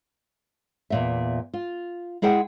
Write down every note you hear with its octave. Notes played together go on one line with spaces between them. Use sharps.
E2 A#2 E5
F4
G#3 E4 G#4 F#5 G5